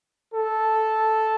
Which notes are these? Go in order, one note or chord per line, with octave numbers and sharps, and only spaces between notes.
A4